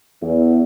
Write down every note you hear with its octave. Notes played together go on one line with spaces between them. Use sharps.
E2